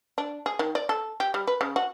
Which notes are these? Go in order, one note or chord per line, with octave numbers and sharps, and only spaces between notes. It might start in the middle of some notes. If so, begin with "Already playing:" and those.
D4
G#4
D#3
D5
A4
G4
G3
B4
C#3
F#4